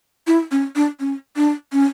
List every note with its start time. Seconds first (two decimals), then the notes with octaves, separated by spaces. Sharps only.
0.27 E4
0.51 C#4
0.76 D4
1.00 C#4
1.36 D4
1.72 C#4